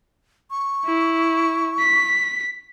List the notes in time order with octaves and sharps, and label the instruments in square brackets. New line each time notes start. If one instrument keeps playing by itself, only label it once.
[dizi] C#6
[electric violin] E4
B6